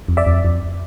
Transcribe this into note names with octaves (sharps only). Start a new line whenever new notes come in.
F2
D5 E5
F2
F2